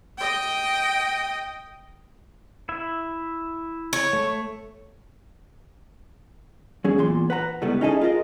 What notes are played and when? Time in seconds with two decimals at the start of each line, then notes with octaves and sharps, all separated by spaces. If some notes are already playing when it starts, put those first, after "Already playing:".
0.18 D#5 G5
2.69 E4 E5
3.93 C#5
4.13 A3
6.84 F#3 C#4 G#4
6.98 E2 A#2 C6
7.30 B4 F#5 A#5
7.62 C#2 A2 G3 A3 B3
7.81 C#4 D#4 E4 G#4 A4 D#5
8.01 F4 G#4 A#4 D#5